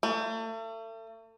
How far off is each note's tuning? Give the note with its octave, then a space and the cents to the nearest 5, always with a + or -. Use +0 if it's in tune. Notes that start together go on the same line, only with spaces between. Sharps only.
A3 +35